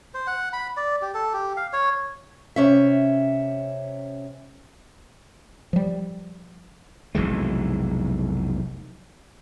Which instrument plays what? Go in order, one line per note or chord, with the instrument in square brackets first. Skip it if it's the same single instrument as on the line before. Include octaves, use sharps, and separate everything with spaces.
[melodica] C5
F#5
B5
D5
G4
A4
G4
F5
C#5
[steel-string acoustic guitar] C3 C#4 E5
[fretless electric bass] F3 G3
[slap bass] F1 B1 E3 G#3